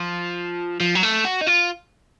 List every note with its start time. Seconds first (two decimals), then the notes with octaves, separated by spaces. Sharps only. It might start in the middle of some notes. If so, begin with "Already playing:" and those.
Already playing: F3
0.80 F3
0.95 F#3
1.03 A3
1.25 F#4
1.41 D#4
1.46 F4